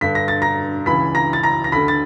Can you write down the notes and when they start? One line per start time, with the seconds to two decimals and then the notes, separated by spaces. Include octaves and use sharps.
0.01 G2 D3 B6
0.15 A#6
0.28 A6
0.42 A#5 A#6
0.86 C#2 C#3 E3 B5 B6
1.15 A#5 A#6
1.33 A6
1.43 A#5 A#6
1.64 A#6
1.72 D2 D3 B5 B6
1.88 A6